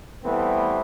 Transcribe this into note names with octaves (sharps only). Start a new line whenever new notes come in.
E3 G3 A3 B3 C4